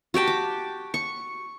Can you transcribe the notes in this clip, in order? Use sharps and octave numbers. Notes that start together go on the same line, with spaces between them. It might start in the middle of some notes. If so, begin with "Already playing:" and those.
F#4 G4 G5 A5
D6
C#6